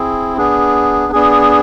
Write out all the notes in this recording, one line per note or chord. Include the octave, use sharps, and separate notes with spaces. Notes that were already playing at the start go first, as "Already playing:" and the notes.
Already playing: C4 E4 G#4
B3 D4 G#4
B3 D4 G#4